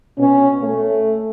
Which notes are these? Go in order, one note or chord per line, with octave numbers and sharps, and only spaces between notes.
B2 C#4
A3